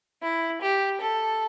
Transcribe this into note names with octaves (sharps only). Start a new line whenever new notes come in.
E4
G4
A4